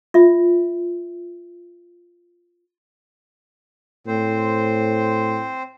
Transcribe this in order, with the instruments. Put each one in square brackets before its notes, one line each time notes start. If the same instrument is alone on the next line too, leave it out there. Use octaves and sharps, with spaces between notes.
[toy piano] F4 E5
[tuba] A2 [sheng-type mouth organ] C4 C5